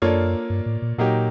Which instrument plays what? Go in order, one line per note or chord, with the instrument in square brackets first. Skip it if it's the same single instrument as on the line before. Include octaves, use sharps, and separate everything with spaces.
[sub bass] F#2 [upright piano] A#3 D4 F4 A4 C#5
[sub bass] G2
A2
A#2
[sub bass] A#2 [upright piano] F#3 A#3 D#4 G4